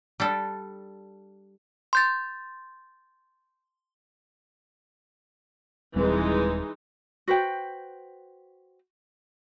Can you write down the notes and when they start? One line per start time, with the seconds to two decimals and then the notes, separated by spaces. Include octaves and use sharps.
0.20 G3 D4 A4
1.93 C6 G6 A6
5.96 D#1 E3 G3 G#3 C4 D#4
7.28 F#4 B4 C5 G5